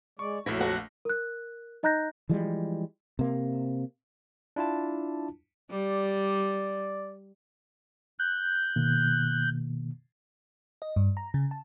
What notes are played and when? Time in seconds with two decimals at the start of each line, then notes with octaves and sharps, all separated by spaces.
0.19 G#3 D5 C#6
0.46 A#1 F2 F#3 A3 E4 A5 A#6
0.60 F#4 F#5
1.05 A#4 F#6
1.83 D#4 D#5 A#5 F#6 G6 A#6
2.29 E3 F3 G3 G#3
3.19 C3 A#3
4.56 D4 E4 F4 A5
5.71 G3 D5
8.19 F#6 G6
8.76 B2 D#3 A#3
10.82 D#5
10.96 G2
11.17 A#5
11.34 C#3
11.51 A5